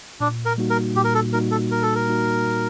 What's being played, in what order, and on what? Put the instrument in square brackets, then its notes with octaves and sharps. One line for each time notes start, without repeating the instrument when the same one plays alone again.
[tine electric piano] A#2 [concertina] D4
[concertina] A#4
[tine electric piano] G3 A#3 D#4 F#4
[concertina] A#4
[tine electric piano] A#2 [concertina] G4
[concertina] A#4
A4
[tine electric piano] G3 A#3 D#4 F#4 [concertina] A#4
[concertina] A4
[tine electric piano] A#2 [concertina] A#4
[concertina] A4
A#4
[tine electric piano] G3 A#3 D#4 F#4
A#2